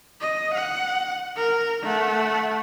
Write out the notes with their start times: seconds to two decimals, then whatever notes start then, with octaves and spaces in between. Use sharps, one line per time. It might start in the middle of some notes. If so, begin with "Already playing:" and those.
0.21 D#5
0.54 F#5
1.37 A#4
1.83 A3 F#5